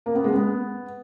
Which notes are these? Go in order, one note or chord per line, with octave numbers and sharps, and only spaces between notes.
A#3
B3
G#3
B3